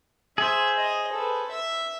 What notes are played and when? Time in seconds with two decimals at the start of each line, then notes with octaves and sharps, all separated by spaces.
0.38 G#4 C5 E5
0.77 D#5
1.13 A4 B4
1.51 E5